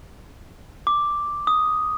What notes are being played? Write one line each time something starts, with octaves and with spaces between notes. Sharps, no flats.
D6
D#6